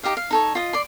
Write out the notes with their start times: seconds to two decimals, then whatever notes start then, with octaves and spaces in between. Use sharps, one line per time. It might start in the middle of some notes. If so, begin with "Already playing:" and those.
0.03 D#4 G4 D#5 F5
0.17 F5
0.31 D#4 A4 C#5
0.55 F4 D#5
0.73 D5 C6